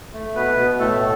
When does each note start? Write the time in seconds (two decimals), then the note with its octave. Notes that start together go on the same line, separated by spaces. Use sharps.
0.13 A3
0.35 B2 B3 B4
0.58 B2
0.79 A2 A3 A4